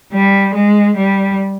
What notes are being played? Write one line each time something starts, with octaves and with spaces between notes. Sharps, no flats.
G3
G#3
G3